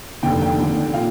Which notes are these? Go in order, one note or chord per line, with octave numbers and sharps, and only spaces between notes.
F1 D#2 D3 G5
G5
D#2 D3
A#2 F5